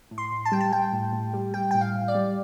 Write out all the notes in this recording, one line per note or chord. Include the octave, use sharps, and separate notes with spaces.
A2
C6
A2
A5
G3 G5
A5
G3 G5
A2
A2
G3
G3 G5
A2 G5
F5
A2
D5
G3